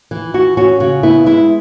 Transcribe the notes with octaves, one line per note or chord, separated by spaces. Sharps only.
E3
E3 F#4
C#4 F#4
C#3 F#4
B3 E4
G#3 E4